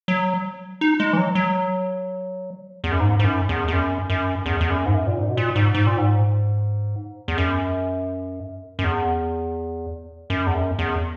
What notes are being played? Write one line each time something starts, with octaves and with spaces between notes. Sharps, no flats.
F#3
D#4
G#3
E3
F#3
F#3
E2
F#2
G#2
G#2
F#2
E2
E2
F#2
F#2
E2
E2
F#2
G#2
F#2
A#2
G#2
B2
A#2
G#2
G#2
A#2
G#2
E2
F#2
F#2
E2
F#2
E2
F#2
E2